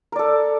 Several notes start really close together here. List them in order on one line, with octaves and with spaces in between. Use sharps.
A#4 D5 A4